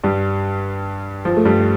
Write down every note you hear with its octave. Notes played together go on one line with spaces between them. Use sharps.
G2 G3
F3
A3
G2 G3